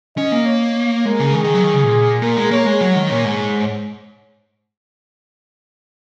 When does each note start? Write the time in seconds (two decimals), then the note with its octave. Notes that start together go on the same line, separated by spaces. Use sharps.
0.17 C#4 D#5
0.32 A#3
0.46 C#5
1.05 G#3 A#4
1.20 C#3
1.34 D#3 G#4
1.44 D#3
1.54 F#3
1.64 D#3
1.73 C#3
1.83 A#2
2.22 A#2 A#4
2.37 G#3
2.51 A#3 C#5
2.66 G#3
2.81 F#3
2.95 D#3
3.10 A#2 C#5
3.24 G#2